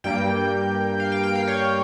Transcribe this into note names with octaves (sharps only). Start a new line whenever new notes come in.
G2 G3 A#3 G5
F5
G5
G5
F5
C#5